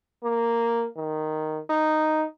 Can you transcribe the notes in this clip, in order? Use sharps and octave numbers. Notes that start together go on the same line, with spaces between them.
A#3
D#3
D#4